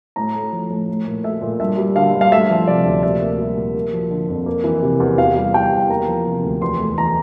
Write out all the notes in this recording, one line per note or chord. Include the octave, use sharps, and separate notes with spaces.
A2 A#5
A3
F3
A2
A3
A#2
A3 E5
A#2
G2 E5
G3
D3 F5
G2
F5
A3 E5
F3
C3 D5
D2
A#2 E5
A#3
G3
A#2
A#3
F3
D3
F2
A#3
E3
C3
E2
E2 F5
G3
E3 G5
E2
A#3 A#5
F3
C3
D2
E2 C6
A3
E3 A#5